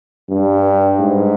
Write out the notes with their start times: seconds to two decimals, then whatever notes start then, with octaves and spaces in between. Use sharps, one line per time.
0.29 G2
1.00 G#2